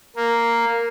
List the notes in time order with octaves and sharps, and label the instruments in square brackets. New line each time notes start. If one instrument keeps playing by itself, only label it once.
[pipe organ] A#3